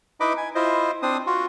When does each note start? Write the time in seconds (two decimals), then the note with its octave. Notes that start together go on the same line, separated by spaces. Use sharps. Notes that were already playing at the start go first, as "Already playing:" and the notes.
0.20 D#4 E4 B4 D#5 B5 D6
0.37 G#5
0.55 E4 F4 C5 D#5
1.03 C4 D4 C5 D#6
1.27 F4 F#4